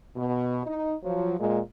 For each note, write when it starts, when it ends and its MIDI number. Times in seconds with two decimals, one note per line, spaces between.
0.17 0.60 47
0.66 0.94 63
1.03 1.34 53
1.03 1.34 54
1.39 1.58 46
1.39 1.58 56